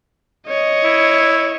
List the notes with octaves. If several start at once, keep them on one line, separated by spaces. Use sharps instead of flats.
C#5 D#5
E4